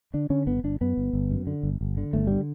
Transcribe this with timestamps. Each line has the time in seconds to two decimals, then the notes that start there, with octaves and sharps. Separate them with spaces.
0.14 D3 D4
0.30 D3 C#4
0.47 G1 B3
0.64 G1 D4
0.81 F#2 B3
0.97 G1
1.13 G1
1.30 F#2
1.47 D3
1.63 G1
1.81 G1
1.97 D3
2.13 G1 A3
2.27 D3 G3